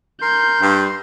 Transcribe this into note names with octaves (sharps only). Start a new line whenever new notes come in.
A#4 C6 G6
G2 C6